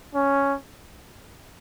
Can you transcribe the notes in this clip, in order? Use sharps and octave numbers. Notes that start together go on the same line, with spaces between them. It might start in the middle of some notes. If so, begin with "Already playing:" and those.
C#4